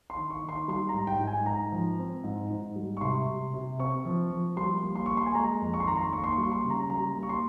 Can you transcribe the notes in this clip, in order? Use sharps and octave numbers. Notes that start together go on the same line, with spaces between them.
C6
D#3
C#6
D#3
C6
G3 C6
A#5
G#2
G5
G#2
G#5
G#2 A#5
F3
C4
G#2
G#2
G3
C#6
C3 C6
C3
C3
C4 C#6
F3
F3
G3 C6
A#3
C6
A#3 C#6
C6
G#5
G#3 A#5
F2
C#6
C6
D#3 A#5
C6
A#3 C#6
C6
C#6
G3
C#6
C6
C#3
A#5
G3 A#5
A#3
C#6
C6